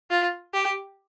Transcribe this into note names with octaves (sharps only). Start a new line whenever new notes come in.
F4
G4